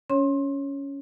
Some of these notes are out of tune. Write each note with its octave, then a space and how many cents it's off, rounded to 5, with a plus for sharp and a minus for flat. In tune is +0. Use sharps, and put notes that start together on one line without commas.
C#4 +10 C#5 -15 C6 +25